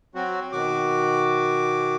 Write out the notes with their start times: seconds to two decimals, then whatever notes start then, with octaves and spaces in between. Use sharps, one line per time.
0.15 F#3 C4 F#4
0.52 B2 D#3 F#4 D6